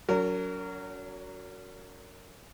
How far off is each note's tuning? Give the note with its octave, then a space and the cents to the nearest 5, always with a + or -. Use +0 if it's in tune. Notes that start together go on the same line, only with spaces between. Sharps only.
F#3 +0 C#4 +45 A#4 -20